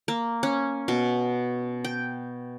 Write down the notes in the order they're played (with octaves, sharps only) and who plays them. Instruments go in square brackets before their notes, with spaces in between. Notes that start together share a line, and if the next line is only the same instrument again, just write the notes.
[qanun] A#3
C#4
B2
G5